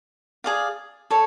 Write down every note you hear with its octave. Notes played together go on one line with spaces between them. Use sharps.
G#4 D5 F5
A4 C#5